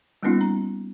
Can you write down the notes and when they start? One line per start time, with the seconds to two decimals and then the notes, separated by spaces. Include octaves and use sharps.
0.23 G3 A#3 B3 C#4 D#4 F4
0.41 A#5